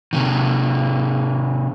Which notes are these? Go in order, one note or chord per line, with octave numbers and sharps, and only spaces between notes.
C3 D#3